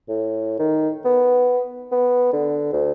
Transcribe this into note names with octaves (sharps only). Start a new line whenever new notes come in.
A2
D#3
B3
B3
D3
D2